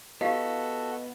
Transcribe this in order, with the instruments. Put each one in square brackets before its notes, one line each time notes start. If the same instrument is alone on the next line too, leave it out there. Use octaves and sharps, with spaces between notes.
[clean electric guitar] B3 [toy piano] E4 G4 F5 [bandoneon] F#4 A4 [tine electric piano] D#5